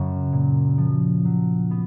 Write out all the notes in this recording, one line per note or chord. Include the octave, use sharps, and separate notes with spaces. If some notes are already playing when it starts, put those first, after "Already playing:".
Already playing: F#2 C#3
A#2
F3
F#3
B3